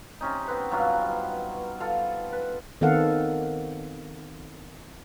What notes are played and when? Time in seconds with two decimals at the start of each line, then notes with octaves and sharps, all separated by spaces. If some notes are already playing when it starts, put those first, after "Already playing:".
0.21 C3 C#4 D#4
0.48 B3 C4 B4
0.71 G2 F#3 F4
1.80 F4 A4
2.32 B4
2.81 D#3 B3 C4 A4 F5 F#5